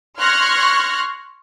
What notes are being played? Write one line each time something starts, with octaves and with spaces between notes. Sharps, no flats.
C6 C#6 F6 F#6 G#6 A#6